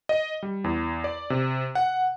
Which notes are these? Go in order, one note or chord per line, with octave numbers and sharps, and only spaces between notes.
D#5
G3
E2
D5
C3
F#5